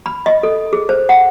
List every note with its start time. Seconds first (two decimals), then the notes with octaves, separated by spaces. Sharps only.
0.06 B5
0.26 D#5
0.43 A4
0.73 G#4
0.89 C5
1.09 F#5